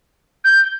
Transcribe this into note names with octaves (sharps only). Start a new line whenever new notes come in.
G6